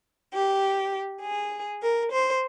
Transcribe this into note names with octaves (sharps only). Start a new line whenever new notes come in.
G4
G#4
A#4
C5